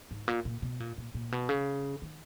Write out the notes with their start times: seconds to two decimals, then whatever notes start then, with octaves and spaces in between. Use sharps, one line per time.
0.11 G#2
0.28 A#2
0.45 A#2
0.62 B2
0.80 A#2
0.98 A#2
1.15 A#2
1.32 B2
1.49 C#3
2.02 D#3